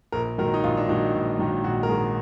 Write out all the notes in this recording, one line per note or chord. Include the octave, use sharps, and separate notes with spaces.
A#1 A#4
G#2 D#3 F#3 A#4
D#4
A#1 F4
D4
G#2 D#3 F#3 D#4
A#1
G#2 D#3 F#3
A#1 F#4
A#4
G#2 D#3 F#3 G#4